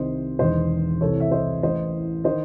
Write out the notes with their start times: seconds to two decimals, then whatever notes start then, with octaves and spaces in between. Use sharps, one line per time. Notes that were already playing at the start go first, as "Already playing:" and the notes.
Already playing: C2 C3 D#3 C5 D#5
0.39 E1 E2 D#3 C5 D#5
1.01 C2 C3 E3 A4 C#5
1.20 E5
1.31 C5 D#5
1.63 A1 A2 E3 C5 D#5
2.24 D#3 C5 D#5